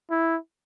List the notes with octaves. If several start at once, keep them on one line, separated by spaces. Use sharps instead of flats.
E4